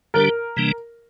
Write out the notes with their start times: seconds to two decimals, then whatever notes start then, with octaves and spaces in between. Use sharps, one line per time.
0.14 D3 G3 D4 G4 A#4
0.57 C3 E3 G3 A#3 D4